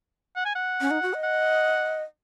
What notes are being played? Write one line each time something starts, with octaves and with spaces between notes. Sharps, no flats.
F#5
G#5
F#5
C#4
D#4
F#4
D#5
F#5